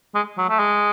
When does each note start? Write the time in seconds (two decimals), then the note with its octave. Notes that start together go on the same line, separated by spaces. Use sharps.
0.15 G#3
0.37 F#3
0.49 A3
0.59 G#3